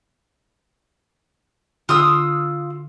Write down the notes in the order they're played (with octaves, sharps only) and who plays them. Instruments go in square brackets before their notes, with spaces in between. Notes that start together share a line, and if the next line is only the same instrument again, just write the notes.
[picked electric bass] D3 [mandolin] F4 D#6 E6